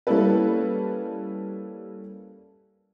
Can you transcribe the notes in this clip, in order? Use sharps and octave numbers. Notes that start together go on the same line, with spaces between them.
G3 A#3 C#4 E4 A4 B4